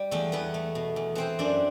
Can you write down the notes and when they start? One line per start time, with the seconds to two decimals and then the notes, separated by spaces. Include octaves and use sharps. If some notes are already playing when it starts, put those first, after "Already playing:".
Already playing: G3
0.11 E2 A3 A4
0.32 E2 B3 B4
0.54 A3
0.75 B2
0.96 E2
1.15 E3 C4 C5
1.39 F#2 D4 D5